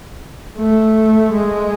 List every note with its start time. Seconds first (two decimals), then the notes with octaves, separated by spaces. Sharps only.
0.58 A3
1.33 G#3